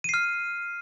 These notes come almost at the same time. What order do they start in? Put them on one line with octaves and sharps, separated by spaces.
D#7 C7 F6